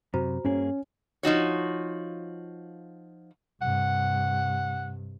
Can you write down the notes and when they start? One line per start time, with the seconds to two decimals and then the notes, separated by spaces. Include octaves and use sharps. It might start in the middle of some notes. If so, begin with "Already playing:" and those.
0.14 F#2 C3 F#4 C5 A#5
0.45 G2 A#3 C#4 G#4
1.23 F3 D#4 F#4 C#5
3.62 G2 C3 F#5